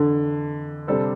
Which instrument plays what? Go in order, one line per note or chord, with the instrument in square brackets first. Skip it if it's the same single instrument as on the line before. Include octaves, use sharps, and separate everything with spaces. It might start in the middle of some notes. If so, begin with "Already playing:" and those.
Already playing: [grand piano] F2 E3 [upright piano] D3
[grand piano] C3 G3 D4 A4 C5